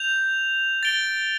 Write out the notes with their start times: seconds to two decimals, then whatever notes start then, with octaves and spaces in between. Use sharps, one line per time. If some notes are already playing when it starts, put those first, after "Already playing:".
Already playing: G6 F7
0.83 A6 D7 G7